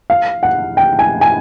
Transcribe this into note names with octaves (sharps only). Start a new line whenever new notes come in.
F5
F#5
G5
G#5
G#5